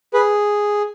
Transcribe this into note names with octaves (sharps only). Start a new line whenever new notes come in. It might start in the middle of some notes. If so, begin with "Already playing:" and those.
G#4 B4